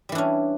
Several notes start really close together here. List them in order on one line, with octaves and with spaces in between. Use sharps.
G3 E3 D4 C#4